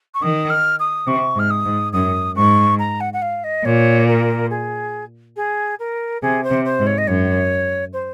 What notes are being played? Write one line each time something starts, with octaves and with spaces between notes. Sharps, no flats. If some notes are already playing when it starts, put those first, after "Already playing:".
C#6
D#3 D#6
F6
D#6
C3 C#6
G#2 F6
D#6
G#2
F#2 D#6
G#2 C#6
A#5
F#5
F#5
F5
D#5
A#2 C#5
A#4
G#4
G#4
A#4
C3 G#4
C5
C3
C5
G#2
C#5
D#5
F#2 C#5
C5